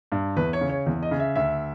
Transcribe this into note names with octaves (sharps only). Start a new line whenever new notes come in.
G2
E2 B4
C#5
C#3
C#5
E2
D#5
C#3
E5
D2 E5